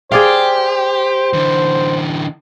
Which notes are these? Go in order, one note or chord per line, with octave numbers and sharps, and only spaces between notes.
G4 G#4 C5 D5 F5
D3 E3